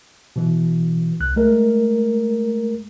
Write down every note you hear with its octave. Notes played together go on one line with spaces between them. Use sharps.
B2 E3
C2 F#6
G#3 A3 A#4